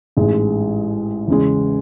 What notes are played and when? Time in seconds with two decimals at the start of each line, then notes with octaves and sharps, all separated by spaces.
0.17 A1 G#2 G#3
1.27 E2 C#3 G#3